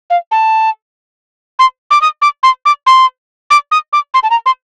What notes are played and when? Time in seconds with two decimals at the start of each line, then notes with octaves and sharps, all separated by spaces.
0.10 F5
0.31 A5
1.59 C6
1.91 D6
2.01 D#6
2.22 D6
2.43 C6
2.65 D6
2.86 C6
3.50 D6
3.71 D#6
3.93 D6
4.14 C6
4.23 A5
4.30 A#5
4.46 C6